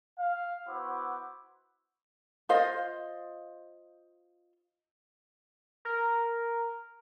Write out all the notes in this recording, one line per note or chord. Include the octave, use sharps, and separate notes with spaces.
F5
B3 E4 F#4 C5 F#5 D6
F4 C5 D#5 F5
A#4